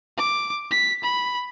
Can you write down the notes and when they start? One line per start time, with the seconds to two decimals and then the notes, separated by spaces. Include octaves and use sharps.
0.17 D6
0.70 B6
1.03 B5